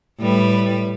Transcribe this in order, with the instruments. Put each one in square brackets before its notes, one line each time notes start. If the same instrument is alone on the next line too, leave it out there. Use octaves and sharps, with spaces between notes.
[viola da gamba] A2 G3 B4